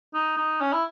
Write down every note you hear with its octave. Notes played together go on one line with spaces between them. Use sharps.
D#4
D#4
C#4
E4